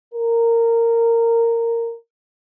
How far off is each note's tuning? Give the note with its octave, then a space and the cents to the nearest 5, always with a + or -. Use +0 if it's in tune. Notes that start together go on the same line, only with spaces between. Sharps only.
A#4 -15